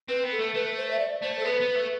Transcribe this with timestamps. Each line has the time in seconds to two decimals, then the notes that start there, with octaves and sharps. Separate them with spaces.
0.08 C4 B4
0.24 B3
0.31 A4
0.39 A3
0.54 A3 B4
0.76 C5
0.90 E5
0.99 D5
1.22 A3 C5
1.39 A4
1.45 B3 B4
1.61 B3
1.76 A3